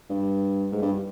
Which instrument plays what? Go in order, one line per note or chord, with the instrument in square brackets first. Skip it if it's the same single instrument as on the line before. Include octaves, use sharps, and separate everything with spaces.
[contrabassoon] G2
G#2
G2